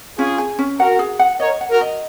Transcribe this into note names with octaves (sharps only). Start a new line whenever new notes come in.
C#4 F4 G#4
G#4
C#4
F#4 A#4 F#5
G#4
F#5
A#4 C#5 D#5
F#5
F#4 A#4
D#5